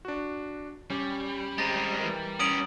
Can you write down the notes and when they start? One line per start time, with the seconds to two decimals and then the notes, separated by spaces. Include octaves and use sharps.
0.05 D4 F#4
0.90 G3 C#4 G4
1.58 G#3 C4 A#5 A6
2.00 E3 A#4
2.39 B3 C#4 D#6 D7 F#7